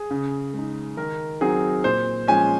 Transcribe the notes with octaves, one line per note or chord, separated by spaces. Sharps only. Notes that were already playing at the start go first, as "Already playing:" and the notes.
Already playing: G#4
C#3
G#3 D#4
D#3 A#4
F#3 C4 D#4 G#4
A#2 C5
F3 G#3 C#4 G#5